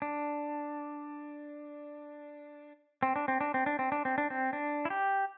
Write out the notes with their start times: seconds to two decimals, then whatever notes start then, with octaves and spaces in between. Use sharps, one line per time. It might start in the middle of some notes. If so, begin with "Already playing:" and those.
0.02 D4
3.03 C4
3.16 D4
3.28 C4
3.41 D4
3.54 C4
3.66 D4
3.79 C4
3.92 D4
4.05 C4
4.18 D4
4.30 C4
4.53 D4
4.85 E4
4.90 G4